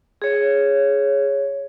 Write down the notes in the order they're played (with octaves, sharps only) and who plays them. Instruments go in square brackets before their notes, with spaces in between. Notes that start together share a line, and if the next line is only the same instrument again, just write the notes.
[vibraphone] G#4 C#5